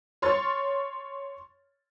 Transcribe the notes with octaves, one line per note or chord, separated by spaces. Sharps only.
C#5 C6 C#6 F6 A6